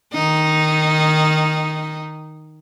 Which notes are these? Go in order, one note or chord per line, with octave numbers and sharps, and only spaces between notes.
D#3 D#4